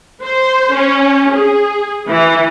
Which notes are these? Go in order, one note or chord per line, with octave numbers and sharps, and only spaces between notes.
C5
C#4
G#4
E3